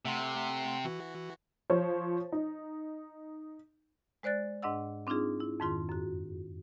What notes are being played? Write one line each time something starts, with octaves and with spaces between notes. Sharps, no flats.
C3 A3 F#5 C6
E3 F#4
F3 C5 C#5
D#4
G#3 C5 D5 F#6 A6
G#2 D4 D#5 F#5 E6
C4 D4 D#4 F4 G#4
E4
F2 G#2 D#3 F4 C6
F#2 F#4